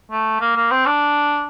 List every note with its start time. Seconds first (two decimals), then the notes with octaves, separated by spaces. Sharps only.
0.11 A3
0.41 A#3
0.56 A#3
0.71 C4
0.86 D4